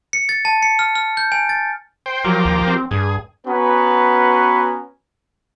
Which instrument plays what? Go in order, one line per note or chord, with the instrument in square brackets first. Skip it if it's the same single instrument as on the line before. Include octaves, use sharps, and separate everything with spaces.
[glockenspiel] C#7
A6
A5
C#7
F6
F6
G6
G#5
A6
[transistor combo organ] C5 G5
[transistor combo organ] F3 G4 A#4 [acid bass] F#3
[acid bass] D#2
C4
[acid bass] G2 [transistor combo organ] G#4
[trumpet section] B3 C#4 F#4 B4 A#5